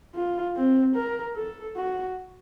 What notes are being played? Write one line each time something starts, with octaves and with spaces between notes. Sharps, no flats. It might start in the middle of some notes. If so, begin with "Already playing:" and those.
F4
C4
A#4
A4
F#4